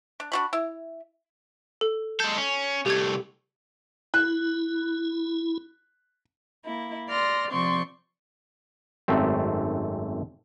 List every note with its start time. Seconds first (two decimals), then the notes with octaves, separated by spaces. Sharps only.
0.20 D4
0.32 D4 F#4 B5
0.53 E4
1.81 A4
2.20 G#3 A4 G6
2.38 C#4
2.86 C2 A3 G4 G#6
4.14 E4 F#6
6.65 A#3 E4
7.08 D5 C6 F6 A#6
7.51 C3 F3 C4 D5 C6 C#6
9.08 G#1 F#2 A3 C4